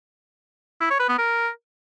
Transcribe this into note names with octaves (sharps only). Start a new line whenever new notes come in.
E4
C#5
B4
B3
A#4